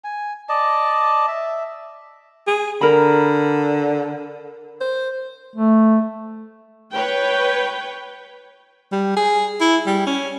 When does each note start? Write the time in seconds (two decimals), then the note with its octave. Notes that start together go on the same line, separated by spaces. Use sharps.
0.04 G#5
0.49 D5 D#5 A5
1.28 E5
2.47 G#4
2.81 D3 A#4 B5
4.81 C5
5.55 A3
6.93 B4 C#5 G5
8.92 G3
9.17 G#4
9.61 E4
9.86 G3
10.07 C#4